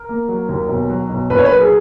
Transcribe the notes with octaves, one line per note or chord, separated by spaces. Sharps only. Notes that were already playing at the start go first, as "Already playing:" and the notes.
Already playing: A#4
A#3
F#3
D#2
B1
F#3
B1
A#1 B4
C#5
F#3 B4
G#4